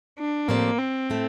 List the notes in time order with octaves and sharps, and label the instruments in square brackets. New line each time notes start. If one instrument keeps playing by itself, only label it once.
[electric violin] D4
[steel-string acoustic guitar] A2 F3 C4 G4 D5 [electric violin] A#3
[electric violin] C4
[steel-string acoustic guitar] A2 A3